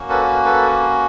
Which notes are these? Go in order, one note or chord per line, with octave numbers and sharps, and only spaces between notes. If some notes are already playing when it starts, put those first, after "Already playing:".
Already playing: A#3 C#4 F#4
A4 B4
A4 B4